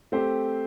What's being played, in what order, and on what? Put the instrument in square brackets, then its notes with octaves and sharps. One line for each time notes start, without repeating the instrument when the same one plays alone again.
[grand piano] A3 C4 G4 C5